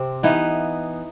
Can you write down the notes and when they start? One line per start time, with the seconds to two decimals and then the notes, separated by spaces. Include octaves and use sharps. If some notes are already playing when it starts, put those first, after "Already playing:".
Already playing: C3 C4
0.23 E3 B3 D#4